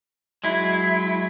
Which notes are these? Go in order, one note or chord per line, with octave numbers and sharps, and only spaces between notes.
F#3 G#3 E4